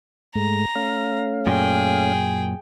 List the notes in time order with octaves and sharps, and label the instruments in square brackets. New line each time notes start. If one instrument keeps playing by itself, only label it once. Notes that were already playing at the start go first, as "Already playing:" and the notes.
[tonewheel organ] G#2 G#3 A3 [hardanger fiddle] A#5
[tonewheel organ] A3 C#4 F5
[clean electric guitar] F#2 A#2 [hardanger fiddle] G#4 G5